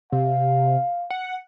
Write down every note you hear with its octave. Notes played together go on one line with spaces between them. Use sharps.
C3 F5
F#5